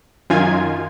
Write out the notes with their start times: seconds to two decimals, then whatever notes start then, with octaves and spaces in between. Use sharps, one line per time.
0.30 F#2 D#3 F4 G#5 G#6